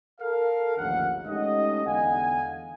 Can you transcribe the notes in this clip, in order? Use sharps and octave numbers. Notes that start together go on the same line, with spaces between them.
A4 A#4 F5
A1 D#2 G#2 D3 F3 F#5
G#3 A3 C#4 D#4 G4 D#5
E2 D3 F5 F#5 G#5